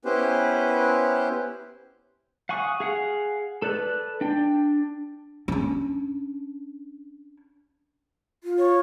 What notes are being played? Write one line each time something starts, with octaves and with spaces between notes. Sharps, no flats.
B3 C#4 E4 G4 B4 C5
F5 F#5 G#5 C#6 D#6
G#4 F5 F#5
A4 B4 D5 F#6
D4 G5
C#4 D4
F4
C#5